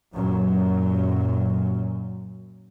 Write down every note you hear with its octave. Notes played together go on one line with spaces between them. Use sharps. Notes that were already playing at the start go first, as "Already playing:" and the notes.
F#2 A#2 F#3